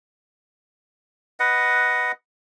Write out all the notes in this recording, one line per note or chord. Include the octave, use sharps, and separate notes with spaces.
B4 D#5 F#5